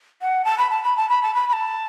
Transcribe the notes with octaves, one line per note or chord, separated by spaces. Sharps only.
F#5
A5
B5
A5
B5
A5
B5
A5
B5
B5
A5